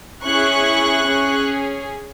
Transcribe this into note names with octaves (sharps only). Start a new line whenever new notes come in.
C#4 E4 G#4 C#6 F#6
C#4 G#4